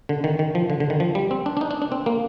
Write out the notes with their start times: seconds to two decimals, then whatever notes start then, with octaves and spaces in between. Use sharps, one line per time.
0.09 D3
0.24 D#3
0.39 D#3
0.55 F3
0.70 D3
0.80 D3
0.90 D#3
1.00 F3
1.15 G3
1.31 C4
1.46 D4
1.57 D4
1.61 D#4
1.71 D4
1.82 D4
1.92 C4
2.06 A#3